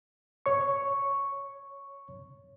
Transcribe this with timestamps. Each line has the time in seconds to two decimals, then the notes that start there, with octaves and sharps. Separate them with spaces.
0.46 C#5 C#6